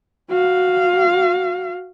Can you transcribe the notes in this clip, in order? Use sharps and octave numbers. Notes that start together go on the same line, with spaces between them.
F#4 F5